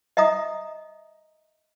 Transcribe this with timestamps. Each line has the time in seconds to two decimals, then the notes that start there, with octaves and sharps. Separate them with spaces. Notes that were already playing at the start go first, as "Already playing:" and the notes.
0.17 D#5 E5 A#5 D#6